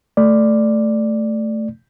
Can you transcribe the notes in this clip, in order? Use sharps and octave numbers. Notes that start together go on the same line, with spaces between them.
A3 D5